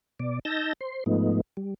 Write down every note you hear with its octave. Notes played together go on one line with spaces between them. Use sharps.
B2 D5
D#4 A5 E6 G6 A#6
C5 C6
G#2 F3 A3 B3 D#4
G3